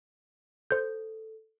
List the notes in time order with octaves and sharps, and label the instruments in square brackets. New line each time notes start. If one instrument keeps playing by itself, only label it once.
[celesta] A4 [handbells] C5 G6